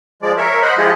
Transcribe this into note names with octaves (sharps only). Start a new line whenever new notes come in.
F3 G#3 D5
A#4 C#5 E5
C5 D#5 F#5 B5
F3 G#3 E4 F4 G4 D#5